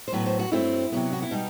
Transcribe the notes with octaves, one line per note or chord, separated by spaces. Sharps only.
C5
A2 F#3 B3 B4
C5
F#4
G2 F#3 A3 C4 E4
C3 F#3 B3
F#4
E4
B2 G3 D#4